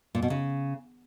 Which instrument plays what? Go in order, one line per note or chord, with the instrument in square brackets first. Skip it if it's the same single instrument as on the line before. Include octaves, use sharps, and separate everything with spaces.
[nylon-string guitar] A#2
B2
C#3